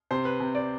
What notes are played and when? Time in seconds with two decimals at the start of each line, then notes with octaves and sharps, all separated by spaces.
0.11 C3 C5
0.25 B4
0.40 C3
0.55 D5